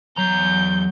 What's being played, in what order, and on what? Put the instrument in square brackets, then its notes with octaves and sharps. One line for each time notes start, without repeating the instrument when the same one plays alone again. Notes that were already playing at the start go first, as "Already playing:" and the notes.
[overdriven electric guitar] E2 A#5 [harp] F#3 [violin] G6